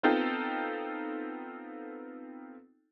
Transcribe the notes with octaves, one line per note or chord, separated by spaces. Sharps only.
B3 C4 D#4 F4 A4 G5